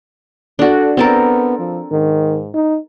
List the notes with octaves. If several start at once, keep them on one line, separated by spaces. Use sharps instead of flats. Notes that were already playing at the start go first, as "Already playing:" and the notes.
D4 F#4 A4
B3 C4 A4 A#4
F3
G#2 D#3
D#4